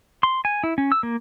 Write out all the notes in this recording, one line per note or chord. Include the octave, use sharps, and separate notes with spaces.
C6
G#5
E4
C#4
E6
A#3